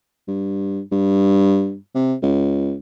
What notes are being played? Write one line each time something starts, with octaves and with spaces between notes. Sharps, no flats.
G2
G2
C3
C#2